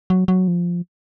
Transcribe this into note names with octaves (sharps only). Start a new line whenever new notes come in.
F#3
F#3
F3